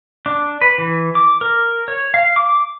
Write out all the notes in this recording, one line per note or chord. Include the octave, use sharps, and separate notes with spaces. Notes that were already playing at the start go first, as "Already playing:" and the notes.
D4
B4
E3
D6
A#4
C#5
F5
D6